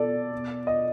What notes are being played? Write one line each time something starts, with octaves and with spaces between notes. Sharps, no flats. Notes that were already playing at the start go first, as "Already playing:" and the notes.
Already playing: B2 A4 D5
B2
D#5